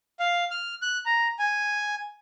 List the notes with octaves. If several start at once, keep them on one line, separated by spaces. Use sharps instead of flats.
F5
F6
F#6
A#5
G#5